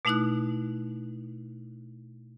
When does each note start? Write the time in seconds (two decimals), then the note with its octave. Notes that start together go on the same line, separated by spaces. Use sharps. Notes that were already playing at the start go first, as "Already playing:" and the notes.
0.05 B2 A3 D#4 E4 D#6 F#6